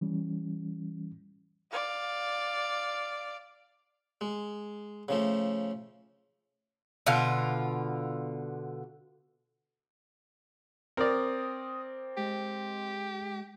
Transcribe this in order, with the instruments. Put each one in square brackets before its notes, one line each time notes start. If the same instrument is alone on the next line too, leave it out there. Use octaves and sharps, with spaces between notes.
[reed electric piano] E3 G3 C#4
[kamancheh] D5 F5
[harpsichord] G#3
C#3 F3 A3
[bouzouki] B2 D3 F4
[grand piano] C4 [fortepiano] A#4 D5 [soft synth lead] D#6
[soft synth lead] G#3 [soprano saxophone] G4